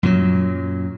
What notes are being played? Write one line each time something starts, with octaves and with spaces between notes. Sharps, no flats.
F#2 A#2 F#3